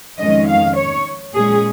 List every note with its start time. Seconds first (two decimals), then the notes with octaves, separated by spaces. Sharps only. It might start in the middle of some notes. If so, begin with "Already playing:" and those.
0.18 F2 D#3 G#3 C#4 D#5
0.47 F5
0.76 C#5
1.34 A#2 G#3 C#4 G#4